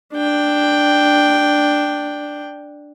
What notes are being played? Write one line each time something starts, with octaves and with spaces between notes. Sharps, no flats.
D4 G5